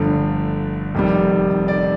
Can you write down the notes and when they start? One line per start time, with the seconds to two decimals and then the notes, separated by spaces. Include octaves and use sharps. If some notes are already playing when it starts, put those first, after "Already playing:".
Already playing: G1 G2 D3 F3 A3
0.95 F1 F2 C3 D#3 G3
1.68 D5